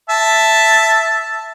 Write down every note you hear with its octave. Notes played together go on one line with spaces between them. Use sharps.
E5 A5